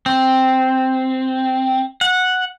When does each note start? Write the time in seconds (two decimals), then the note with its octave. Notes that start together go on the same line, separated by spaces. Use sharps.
0.06 C4
2.01 F#5